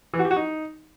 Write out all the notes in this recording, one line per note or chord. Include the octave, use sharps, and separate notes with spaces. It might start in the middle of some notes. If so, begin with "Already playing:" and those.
E3
F#4
G4
F#4
D#4